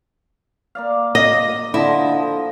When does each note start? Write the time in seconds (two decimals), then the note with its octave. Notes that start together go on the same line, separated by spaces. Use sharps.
0.75 A#3 D5 F5
1.15 D#5
1.74 D3 F3 E4 D#5